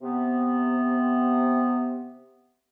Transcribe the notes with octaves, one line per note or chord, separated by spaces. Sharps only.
C3 B3